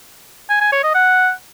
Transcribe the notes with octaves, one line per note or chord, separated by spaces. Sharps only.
G#5
G#5
C#5
D#5
F#5